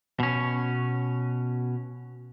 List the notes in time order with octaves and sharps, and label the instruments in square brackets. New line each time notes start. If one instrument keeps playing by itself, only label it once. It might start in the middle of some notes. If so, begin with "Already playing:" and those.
[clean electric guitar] B2 C#4